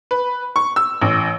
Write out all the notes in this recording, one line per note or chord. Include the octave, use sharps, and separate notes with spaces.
B4
C#6
E6
A1